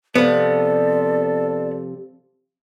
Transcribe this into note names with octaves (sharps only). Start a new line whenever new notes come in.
C3 F3 B3 A4 D5